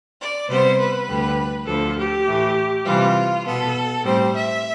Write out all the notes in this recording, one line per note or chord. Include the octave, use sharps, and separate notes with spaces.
D5
C3 G3 B3 C5
B4
D2 D3 G3
D2 D3 F3 A4
G4
A2 E3 A3
C3 E3 G3 F4
B2 B3 A4
A2 G3 C4 C5
E5